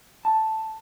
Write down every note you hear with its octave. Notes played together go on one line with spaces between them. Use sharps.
A5